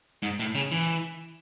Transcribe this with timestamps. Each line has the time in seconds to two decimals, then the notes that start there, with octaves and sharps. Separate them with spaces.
0.23 G#2
0.40 A2
0.55 C#3
0.71 E3